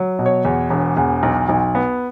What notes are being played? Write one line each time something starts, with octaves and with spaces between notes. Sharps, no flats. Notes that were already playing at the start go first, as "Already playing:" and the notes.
Already playing: F#3
B2
C#5
E2
E1
E2
B1
B1
B3